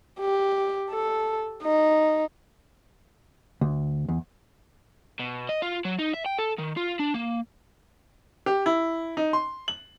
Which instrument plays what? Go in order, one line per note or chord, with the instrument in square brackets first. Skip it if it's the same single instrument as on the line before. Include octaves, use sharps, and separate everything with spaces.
[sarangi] G4
A4
D#4
[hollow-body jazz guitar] D2
E2
[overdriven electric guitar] B2
D#5
F4
F#3
D#4
E5
G5
A4
D#3
F4
D4
A#3
[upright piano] G4
E4
D#4
C6
F#7